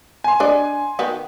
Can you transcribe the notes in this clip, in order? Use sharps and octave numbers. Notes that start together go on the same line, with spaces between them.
G#5 C6
D4 D5 D#5
D#3 B3 F#4